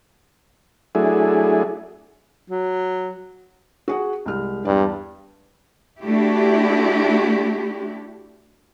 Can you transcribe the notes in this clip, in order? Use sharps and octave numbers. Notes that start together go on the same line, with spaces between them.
F#3 A3 D4 E4 G#4
F#3
F#4 G#4 F#5
C2 G#3 F6
E2 G2 D5
A3 D4 E4 F#4 G4